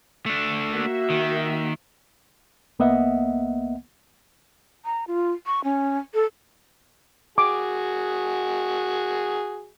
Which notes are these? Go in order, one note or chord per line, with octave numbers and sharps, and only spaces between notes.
A3 D4
A#3 F#4 E5
D#3
C2 A#3 B3 D#5 E5 F#5
A#5
F4
C#6
C#4
A4
F#4 G#4 D6